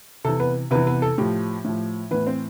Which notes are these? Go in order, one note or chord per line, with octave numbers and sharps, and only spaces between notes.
C3 E3 A4
B3 B4
C3 E3 B3 B4
B3 B4
A4
A2 F3 G4
A2 F3
A2 E3 B3 B4
C4 C5